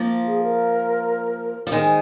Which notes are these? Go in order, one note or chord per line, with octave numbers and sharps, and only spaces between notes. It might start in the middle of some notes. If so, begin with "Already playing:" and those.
Already playing: F3 A#3
F4
G#4
A#4
F3
D#3 G#3 C5